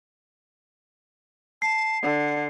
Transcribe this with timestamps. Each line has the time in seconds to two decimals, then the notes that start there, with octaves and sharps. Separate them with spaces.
1.62 A5 C7
2.02 D3 F#5